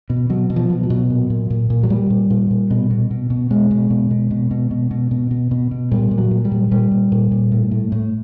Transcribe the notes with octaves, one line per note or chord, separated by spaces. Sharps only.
B2
B2 F#3
B2
F3
B2
F#3
B2
A#2
A#2
A#2
A#2
F#3
A#2 G3
A#2
A#2
A#2
B2
B2
B2
B2
B2 G#3
B2
B2
B2
B2
B2
B2
B2
B2
B2
B2
B2
A#2 G3
A#2
F#3
A#2
G3
A#2
A#2 G3
A#2
A#2
A#2
A2
A2
A2